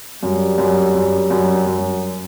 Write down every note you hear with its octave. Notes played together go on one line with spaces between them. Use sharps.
F#2 G3
F#2
F#2
F#2
F#2